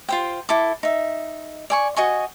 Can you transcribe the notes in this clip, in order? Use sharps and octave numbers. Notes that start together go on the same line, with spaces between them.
F4 C5 G5
E4 A4 D6
D#4 E5
D5 G#5 C#6
F#4 D#5 G#5 C#6